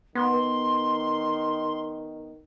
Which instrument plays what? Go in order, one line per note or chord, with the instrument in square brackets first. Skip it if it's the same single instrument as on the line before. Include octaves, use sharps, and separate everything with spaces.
[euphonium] D#3 [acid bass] B3 [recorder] C6